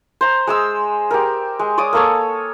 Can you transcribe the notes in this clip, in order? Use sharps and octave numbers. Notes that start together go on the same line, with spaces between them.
C5 A#5
G#3 G#4 E6
G4 A#4
G#3
C#5 D5 D6 D#6
A#3 A4 C#5